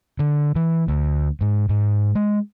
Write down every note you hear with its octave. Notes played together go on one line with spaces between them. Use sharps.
D3
E3
D2
G#2
G#2
G#3